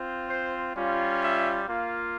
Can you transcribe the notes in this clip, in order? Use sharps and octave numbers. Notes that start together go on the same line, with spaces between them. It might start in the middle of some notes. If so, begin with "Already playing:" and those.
Already playing: C4 F4
C5
G3 C#4 F4
E5
A#3 F4